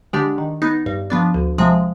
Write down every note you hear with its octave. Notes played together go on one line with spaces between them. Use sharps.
D3 G#3 D4 G4
D#3
B3 D#4
G2
F3 B3 D4
D2
C3 F3 G#3